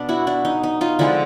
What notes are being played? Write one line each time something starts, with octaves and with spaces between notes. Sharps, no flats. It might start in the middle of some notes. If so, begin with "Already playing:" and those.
Already playing: B2 B3 D4
E4 F#4
D4 E4
D#4
D#4
D#4 F4
D3 F3 G#3 C4 D4 E4